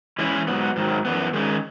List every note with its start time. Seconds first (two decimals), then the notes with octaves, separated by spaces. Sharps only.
0.18 E3 G#3 C#4 E4 G#4
0.47 G#2 F#3 B3
0.76 G#2 D#3 F#3
1.05 F#2 E3 B3
1.33 D#3 G#3 C#4 G#4